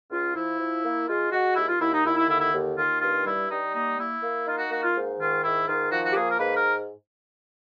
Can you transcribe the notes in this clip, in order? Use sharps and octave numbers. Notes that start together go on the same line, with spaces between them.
C#2 F4
F3 E4
F3
A#3
G#3 F4
G#3 F#4
D#2 E4
F4
D#2 E4
D#4
D#2 E4
E4
D3 E4
E4
D#2
D#2 F4
G2 F4
G3 E4
G3 D#4
A#3 D#4
A#3 E4
A#3
D#4 F4
F#4
A#3 F#4
F4
G#2
D#3 F4
G#2 E4
D#3 F4
F3 F#4
F#4
G4
A#3 G#4
A#4
G#2 B4
A#4